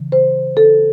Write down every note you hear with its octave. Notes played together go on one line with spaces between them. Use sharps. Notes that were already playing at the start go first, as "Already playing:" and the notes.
Already playing: C#3 E3
C5
A4